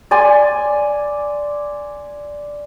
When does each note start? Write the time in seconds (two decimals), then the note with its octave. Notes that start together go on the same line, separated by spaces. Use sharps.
0.11 D5 G#5 C6